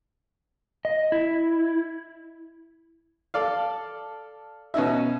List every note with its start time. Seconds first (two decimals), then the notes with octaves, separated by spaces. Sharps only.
0.85 D#5
1.12 E4
3.34 A4 D5 F5
4.74 B2 C#4 D#4 E5